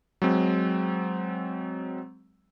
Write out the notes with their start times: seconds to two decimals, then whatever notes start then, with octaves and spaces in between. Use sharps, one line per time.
0.22 F#3 G#3 C4